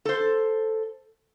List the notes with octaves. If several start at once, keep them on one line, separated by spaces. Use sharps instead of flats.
A4 C5